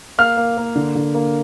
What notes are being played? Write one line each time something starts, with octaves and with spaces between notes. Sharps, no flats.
A#3 F5 F6
A#3
A#3
D3
D3
A#3